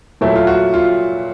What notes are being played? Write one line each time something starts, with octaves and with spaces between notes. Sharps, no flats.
A#2 F#3 A3 E4
F4
F#4
F4